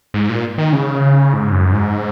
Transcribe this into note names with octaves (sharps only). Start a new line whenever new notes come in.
G#2
A#2
D#3
C#3
G#2
F#2
G#2